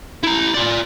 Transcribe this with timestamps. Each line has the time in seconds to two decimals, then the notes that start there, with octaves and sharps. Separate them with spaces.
0.24 E4 A#5
0.54 F4 D5